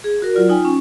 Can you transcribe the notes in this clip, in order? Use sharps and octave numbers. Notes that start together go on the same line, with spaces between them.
G#4
F#4 A#4
F#3 F4 D5
D#4 F4 G5 G#5
C#4